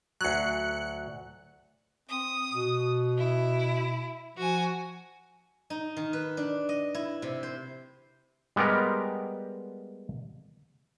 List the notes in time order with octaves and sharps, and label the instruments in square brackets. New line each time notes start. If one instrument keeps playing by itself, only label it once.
[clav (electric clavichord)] D2 F#3 [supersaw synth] F#6 C#7
[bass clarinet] C4 [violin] D#6
[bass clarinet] B2
[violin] E4
[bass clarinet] F3 [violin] F#4 G#5
[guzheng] D#4
D#3
B4
D4
D#5
E4
C3
C5
[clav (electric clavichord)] G3 G#3 B3 G4 A#4